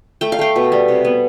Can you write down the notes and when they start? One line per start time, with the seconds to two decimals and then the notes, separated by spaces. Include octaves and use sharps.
0.21 A3 G5
0.32 F5
0.39 A3 G5
0.56 B2
0.72 G3
0.88 C3
1.05 B3